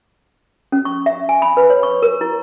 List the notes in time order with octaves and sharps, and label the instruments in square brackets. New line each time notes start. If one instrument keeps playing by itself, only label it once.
[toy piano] C#4
C#6
E5
G#5
B5
B4
C#5
C#6
A#4
E4